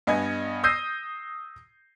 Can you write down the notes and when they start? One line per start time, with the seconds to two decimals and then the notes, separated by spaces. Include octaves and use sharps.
0.07 G2 B3 D#5 G#5 G#6
0.64 D#6 E6 G6 A#6 C7 D#7